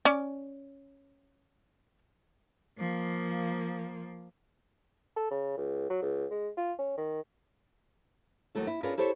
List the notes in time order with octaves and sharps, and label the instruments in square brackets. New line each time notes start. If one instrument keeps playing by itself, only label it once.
[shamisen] C#4 D5
[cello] F3 A#3
[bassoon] A4
C#3
C#2
F#3
C#2
G#3
F4
C#4
D#3
[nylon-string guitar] D#2 F#3 A3 E4
E4
C#4 D4 F4 G#4 A#4 B4
E4 G4 A4 C5 C#5